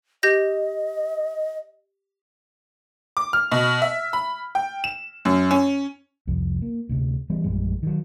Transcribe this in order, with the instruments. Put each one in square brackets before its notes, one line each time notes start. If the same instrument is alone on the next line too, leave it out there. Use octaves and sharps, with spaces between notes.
[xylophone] G4 G6 A#6 [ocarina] D#5
[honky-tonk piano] D6
F6
B2
E5
B5
G5
E7
F#2
C#4
[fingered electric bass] C2 F2
A#3
D2 C3
E3 G3 B3
A#1 F#2 G3 G#3
D#3 F#3